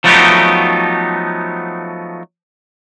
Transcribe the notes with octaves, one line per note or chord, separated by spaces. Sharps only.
F3 F#3 A3 B3 D#4 G4